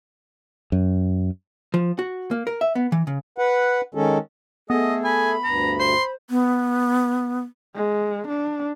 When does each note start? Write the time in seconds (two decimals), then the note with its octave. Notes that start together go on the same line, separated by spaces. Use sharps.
0.72 F#2
1.74 F3
1.99 F#4
2.31 A#3
2.47 A#4
2.61 E5
2.75 B3
2.92 E3
3.07 C#3
3.38 B4 F#5
3.95 D#3 G#3 C#4 A4
4.70 A3 B3 G#4 A4 D#5
5.04 G#5 B5
5.44 D2 G2 A#5
5.79 C5 C6
6.30 B3
7.76 G#3
8.29 D4